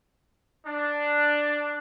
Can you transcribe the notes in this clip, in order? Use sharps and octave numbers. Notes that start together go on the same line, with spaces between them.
D4